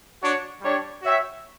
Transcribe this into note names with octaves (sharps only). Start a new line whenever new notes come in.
D4 F#4 C#5
G3 D4 G4 C#5
F#4 C#5 E5 G5